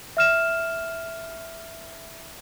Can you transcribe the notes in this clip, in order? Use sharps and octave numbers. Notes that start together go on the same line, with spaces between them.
E5 F6 E7